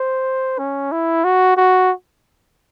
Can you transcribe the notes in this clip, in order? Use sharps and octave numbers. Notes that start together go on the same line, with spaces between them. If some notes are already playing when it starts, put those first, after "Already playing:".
Already playing: C5
C#4
E4
F#4
F#4